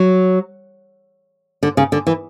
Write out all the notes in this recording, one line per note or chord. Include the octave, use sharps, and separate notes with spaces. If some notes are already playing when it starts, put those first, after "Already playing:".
Already playing: F#3
D3
C#3
D3
E3